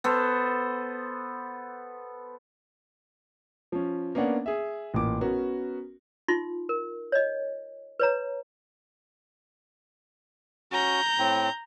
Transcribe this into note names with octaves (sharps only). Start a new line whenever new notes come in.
B3 A4 C5
F3 C#4
A#3 B3 C#4 D4 F#5
G#4 E5
A1 A#2 D6
B3 C#4 F#4 A#4
D#4 F4 C6
A#4
C#5 D#5
B4 C#5 A#5
C#4 F#4 A#5 G6
A2 C4